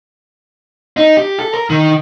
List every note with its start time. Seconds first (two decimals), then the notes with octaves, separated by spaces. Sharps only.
0.97 D#4
1.17 G4
1.39 A4
1.54 A#4
1.70 D#3